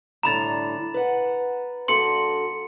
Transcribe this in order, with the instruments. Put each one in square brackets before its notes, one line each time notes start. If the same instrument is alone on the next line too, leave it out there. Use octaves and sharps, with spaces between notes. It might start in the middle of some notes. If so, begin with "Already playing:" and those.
[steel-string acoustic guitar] A2 D3 G3 [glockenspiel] A#5 B5 A6
[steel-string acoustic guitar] B4 F#5
[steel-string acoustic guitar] G2 F#4 A4 [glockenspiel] C6 C#7